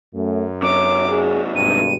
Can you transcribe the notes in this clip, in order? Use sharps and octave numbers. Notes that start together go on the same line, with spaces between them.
F#2 A3
C3 F#3 C#5 D6
G#4
G#1 G2 B2 D#7